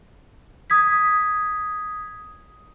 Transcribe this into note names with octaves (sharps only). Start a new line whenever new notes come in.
D#6 G#6 B6